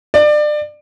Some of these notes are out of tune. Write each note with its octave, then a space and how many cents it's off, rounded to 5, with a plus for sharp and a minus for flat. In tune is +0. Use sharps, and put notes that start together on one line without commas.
D5 +30